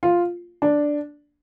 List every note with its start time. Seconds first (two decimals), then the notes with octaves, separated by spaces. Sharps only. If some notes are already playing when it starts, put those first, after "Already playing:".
0.03 F4
0.62 D4